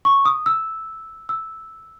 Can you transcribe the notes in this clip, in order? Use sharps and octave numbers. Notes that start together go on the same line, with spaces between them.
C#6
D#6
E6
E6